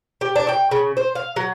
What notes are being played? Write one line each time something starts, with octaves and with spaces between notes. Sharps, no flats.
G4
D4
G5
C#3
C5
F5
F#3